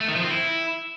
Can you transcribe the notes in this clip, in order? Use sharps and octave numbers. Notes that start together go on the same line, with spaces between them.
A3
D#3
F3
C4
E4